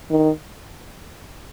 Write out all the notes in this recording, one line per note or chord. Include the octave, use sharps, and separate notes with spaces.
D#3